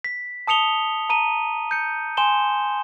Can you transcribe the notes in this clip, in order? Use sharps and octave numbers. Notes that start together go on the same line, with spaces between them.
B6
A5 D#6 C#7 F7 G7
A5 A#5 D#7
G6 C#7
G#5 C6 E7 G7